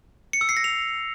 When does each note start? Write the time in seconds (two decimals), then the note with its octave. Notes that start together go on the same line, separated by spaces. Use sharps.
0.33 C#7
0.41 E6
0.49 C7
0.57 A#6
0.64 F7